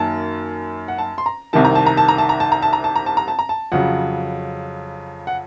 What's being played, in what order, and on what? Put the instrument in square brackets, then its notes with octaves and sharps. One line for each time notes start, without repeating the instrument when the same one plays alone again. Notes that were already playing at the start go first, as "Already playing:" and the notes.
Already playing: [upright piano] F#2 D#3 A#3 A5
F#5
A5
C6
A#5
C2 C3 D#3 A5
A#5
A5
A#5
A5
A#5
A5
A#5
A5
A#5
A5
A#5
A5
A#5
A5
A#5
A5
A#5
A5
F2 C#3 F#3 F#5
F#5